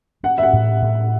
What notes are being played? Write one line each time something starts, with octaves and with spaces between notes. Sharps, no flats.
C#4 F#5
E5
F#5
A2
A2